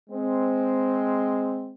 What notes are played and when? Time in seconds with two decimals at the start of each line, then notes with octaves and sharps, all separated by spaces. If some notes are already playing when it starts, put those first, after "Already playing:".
0.10 G#3 C4